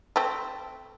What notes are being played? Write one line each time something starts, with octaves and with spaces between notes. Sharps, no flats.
A3 C4